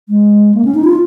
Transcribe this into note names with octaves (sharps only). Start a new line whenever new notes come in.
G#3
A#3
C#4
D#4
F4